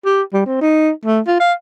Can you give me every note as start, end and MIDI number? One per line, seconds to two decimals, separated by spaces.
0.05 0.22 67
0.33 0.42 55
0.46 0.59 60
0.61 0.90 63
1.05 1.20 57
1.27 1.36 65
1.40 1.53 77